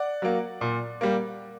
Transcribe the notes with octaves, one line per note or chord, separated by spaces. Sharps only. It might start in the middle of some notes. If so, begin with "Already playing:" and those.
Already playing: D5 F#5
F#3 A#3
A#2
G3 A#3